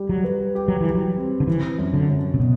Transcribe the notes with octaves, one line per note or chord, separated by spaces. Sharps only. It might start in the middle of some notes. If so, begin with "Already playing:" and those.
Already playing: G3 G4
F#3
B4
G4
F#3
E3
G4
F#3
C4
D3
E3 C4
F#2
D3
F#2
C3
B2